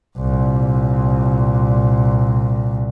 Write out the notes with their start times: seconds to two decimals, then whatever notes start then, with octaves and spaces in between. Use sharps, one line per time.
0.18 C2 A#2